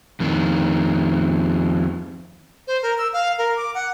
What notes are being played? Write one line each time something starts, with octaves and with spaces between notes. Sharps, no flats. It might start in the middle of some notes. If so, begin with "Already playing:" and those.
F2 D#3
C5
A#4
E6
F5
A#4
D6
F#5